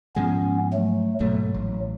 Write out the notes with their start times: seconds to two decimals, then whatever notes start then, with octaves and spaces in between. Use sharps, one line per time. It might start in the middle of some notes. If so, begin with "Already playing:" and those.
0.16 G#2 F3 G#3 B3 C#4
0.73 F#3 A3
1.20 G#2 B2 F#3 A3
1.54 A1